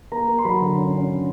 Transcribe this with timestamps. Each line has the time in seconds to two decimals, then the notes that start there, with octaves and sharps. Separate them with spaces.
0.12 A#3 A#5
0.28 A#3
0.38 C6
0.45 F#3 B5
0.61 D3
0.77 C#4
0.94 C#4
1.09 D3